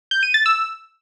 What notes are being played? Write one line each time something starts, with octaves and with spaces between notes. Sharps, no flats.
G6
D#7
A6
E6